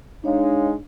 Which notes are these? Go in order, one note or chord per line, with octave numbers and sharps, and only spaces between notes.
G#3 D4 D#4 C#5 F5